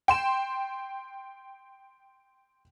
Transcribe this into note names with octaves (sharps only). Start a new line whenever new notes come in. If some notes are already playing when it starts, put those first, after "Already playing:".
G5 C6 E7